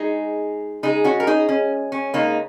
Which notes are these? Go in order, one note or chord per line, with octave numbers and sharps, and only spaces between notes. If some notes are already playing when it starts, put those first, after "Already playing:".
Already playing: G#3 D#4 G#4
C#3 G#3 D#4 G#4
C#4 F#4
A#4
D#4 G#4
C#4
C#4
C#3 G#3 A#3 D#4